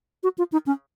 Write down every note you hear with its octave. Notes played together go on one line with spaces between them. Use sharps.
F#4
F4
D#4
C#4